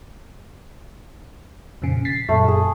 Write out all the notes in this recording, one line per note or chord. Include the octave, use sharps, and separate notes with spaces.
F2 A#2 C#3
A6 B6 C7
F#2 A#2 A3
A3 G#4